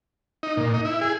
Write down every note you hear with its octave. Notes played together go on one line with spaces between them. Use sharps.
D#4
A#2
D#4
E4
G#4